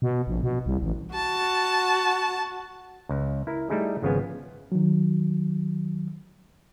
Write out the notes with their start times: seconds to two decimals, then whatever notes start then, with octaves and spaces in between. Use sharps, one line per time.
0.02 B2
0.27 A#1
0.43 B2
0.66 C2
0.83 A1
1.15 F#4 A5
3.09 C#2
3.47 E4 A#4
3.70 G3 A3 D#4 E4 G#4
4.02 G#1 C#3 F3 B3 G#5
4.72 D#3 F#3